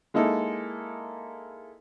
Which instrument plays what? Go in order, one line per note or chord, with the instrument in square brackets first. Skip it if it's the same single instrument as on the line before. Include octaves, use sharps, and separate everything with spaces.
[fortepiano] G#3 A#3 D#4 E4 A4 A#4